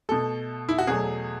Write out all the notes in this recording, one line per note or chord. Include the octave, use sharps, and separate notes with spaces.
B2 A3 A4
E4
F#4
E2 B2 F#3 A3 G#4